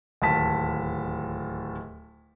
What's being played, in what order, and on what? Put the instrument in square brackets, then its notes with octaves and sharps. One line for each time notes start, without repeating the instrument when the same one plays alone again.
[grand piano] D1 D#2 A5 B6